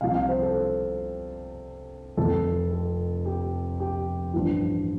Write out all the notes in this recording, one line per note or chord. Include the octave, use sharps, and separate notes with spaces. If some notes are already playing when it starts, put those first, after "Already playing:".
C2 C3 F3 F5
F5
C5
A4
F1 F2 C3 F3 A4
A4
G4
G4
A1 G2 F3 F4